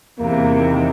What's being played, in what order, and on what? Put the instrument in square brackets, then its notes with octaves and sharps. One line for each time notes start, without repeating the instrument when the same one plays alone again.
[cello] E2 C3 [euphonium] A#3
[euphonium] D#3